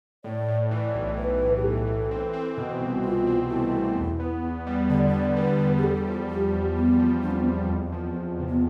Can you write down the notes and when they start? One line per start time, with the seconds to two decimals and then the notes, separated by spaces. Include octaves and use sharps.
0.24 A2 D5
0.48 A2
0.71 E3 D5
0.94 B1
1.17 A2 B4
1.41 B1
1.57 G4
1.64 B1 A4
1.87 E3
2.11 C4
2.33 C4
2.58 B2
2.80 C2
3.03 B2 F4
3.27 C4
3.50 A3 E4
3.74 B2
3.97 E2
4.20 B3
4.44 E2
4.67 G3
4.89 D3 D5
5.08 D5
5.13 D3
5.36 G3 B4
5.59 G3
5.78 G4
5.82 E2 A4
6.07 F3
6.30 F3 G4
6.53 E2
6.76 E2 B3
6.99 F3
7.22 E2 D4
7.31 C4
7.40 B3
7.45 E2 C4
7.69 F2
7.92 F3
8.16 F3
8.40 C3
8.49 B3